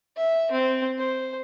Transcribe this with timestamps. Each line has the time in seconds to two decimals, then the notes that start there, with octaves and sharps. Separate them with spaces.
0.16 E5
0.51 C4
0.98 C5